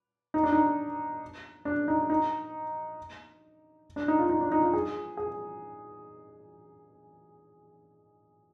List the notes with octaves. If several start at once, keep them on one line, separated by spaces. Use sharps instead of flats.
D#4
D4
D#4
D4
D#4
D#4
D4
D#4
F4
D#4
D4
D#4
F4
G#4
G#4